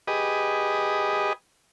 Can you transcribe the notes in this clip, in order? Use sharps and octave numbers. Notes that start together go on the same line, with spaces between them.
G4 G#4 B4 D#5